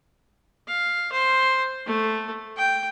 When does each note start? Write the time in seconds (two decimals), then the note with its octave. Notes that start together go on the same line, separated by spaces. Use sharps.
0.68 F5
1.12 C5
1.86 A3
2.57 G5